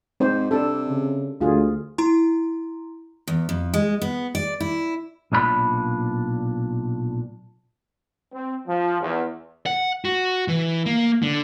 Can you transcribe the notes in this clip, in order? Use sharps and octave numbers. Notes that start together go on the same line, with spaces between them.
G#2 C4 C5
C3 D4 A4
C#3
D2 F4 G#4
E4 A#5 C6
E2
F2
G#3
B3
D5
E4
B1 A#2 D4 G4 B5
C4
F3
E2
F#5
F#4
E3
A#3
D3